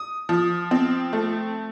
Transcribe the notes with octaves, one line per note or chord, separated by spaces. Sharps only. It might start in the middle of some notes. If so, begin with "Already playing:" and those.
Already playing: D#6
F3
C4
A3